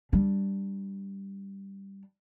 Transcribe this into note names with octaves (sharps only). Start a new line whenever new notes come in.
G3 D4